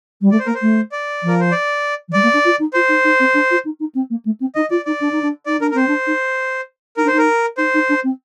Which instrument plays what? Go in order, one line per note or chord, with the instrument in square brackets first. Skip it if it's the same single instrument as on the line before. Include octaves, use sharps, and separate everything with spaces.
[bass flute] G3
[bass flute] A3 [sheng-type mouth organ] D5
[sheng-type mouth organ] C5
[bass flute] A#3 [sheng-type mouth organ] A#4
[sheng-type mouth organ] C5
[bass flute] A3
[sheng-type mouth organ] D5
[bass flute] F3
[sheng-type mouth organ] A#4
C5
D5
[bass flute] F3
[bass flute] G3 [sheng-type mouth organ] D5
[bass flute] A#3
D4
F4
D#4
[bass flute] F4 [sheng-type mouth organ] C5
[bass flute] D#4
D#4
C4
D4
F4
D#4
D#4
C4
A#3
A3
C4
[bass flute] D#4 [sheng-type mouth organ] D#5
[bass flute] F4 [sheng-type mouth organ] D5
[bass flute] D#4 [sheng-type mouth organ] D5
[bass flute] D4
D#4
D4
[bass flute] D#4 [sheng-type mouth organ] D5
[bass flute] D4 [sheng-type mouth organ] A#4
[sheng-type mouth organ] A#4
[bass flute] C4 [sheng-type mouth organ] C5
[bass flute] D4
D#4
[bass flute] D#4 [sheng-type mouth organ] A#4
[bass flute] D4
[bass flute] D#4 [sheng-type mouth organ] C5
[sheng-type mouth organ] A#4
[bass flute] D#4 [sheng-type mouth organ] C5
[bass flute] D#4
D4
C4